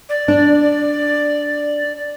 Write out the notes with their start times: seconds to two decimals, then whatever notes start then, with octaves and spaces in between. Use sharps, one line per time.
0.09 D5
0.28 D4